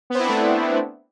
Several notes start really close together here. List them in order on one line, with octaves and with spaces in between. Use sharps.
B3 C4 E4 D4 A3